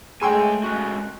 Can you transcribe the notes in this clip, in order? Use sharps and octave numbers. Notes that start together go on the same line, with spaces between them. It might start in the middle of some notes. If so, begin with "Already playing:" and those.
G#3 A3 G#4 C#5 G5 G#5 C6 E6
G#3 C#4 F#4 F#6